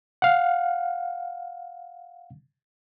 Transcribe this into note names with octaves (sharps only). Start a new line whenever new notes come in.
F5 F#5